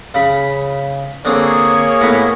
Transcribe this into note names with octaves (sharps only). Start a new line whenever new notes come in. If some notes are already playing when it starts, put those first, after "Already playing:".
C#3 B5
D3 A#3 C4 G#4 C#5
A2 B3